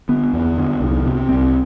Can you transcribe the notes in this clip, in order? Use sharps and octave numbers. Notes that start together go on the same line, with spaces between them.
D3 B3
E2
D3
C2
C3
C2 C4